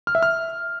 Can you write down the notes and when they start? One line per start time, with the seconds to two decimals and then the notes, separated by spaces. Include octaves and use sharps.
0.07 F6
0.15 E5
0.23 F6